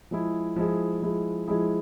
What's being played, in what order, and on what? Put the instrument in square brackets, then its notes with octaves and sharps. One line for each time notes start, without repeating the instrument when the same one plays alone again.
[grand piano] F3 G#3 E4 G#4
F3 G#3 E4 G#4
F3 G#3 E4 G#4
F3 G#3 E4 G#4